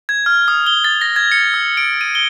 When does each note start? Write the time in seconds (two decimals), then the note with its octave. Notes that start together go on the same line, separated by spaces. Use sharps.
0.09 G#6
0.26 F6
0.48 D#6
0.66 G7
0.84 A6
1.01 A#6
1.16 G#6
1.32 C#7
1.54 E6
1.77 D7
2.01 D#7
2.15 G7